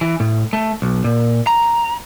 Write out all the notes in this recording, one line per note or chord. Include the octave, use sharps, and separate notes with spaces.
E3
A2
A3
B1
A#2
A#5